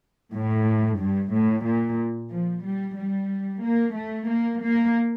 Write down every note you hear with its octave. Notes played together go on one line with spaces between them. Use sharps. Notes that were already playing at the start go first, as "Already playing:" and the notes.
A2
G2
A2
A#2
F3
G3
G3
A#3
A3
A#3
A#3